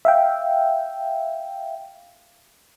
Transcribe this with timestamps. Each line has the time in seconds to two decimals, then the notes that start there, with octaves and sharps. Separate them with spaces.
0.05 E5 F5 G5